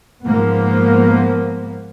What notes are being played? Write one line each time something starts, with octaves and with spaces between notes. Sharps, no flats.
G#2 F3 A#3 B3